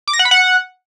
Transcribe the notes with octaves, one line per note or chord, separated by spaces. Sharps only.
D6
A#6
F#5
B5
F#5